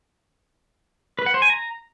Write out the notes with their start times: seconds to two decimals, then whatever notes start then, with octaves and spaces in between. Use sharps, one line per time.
1.19 B4
1.26 F#5
1.34 C5
1.42 G#5
1.50 A#5